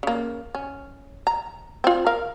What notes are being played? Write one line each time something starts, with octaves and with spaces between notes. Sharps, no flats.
C#3 A#3
C#4
A#5
C4 F4
A#4 F5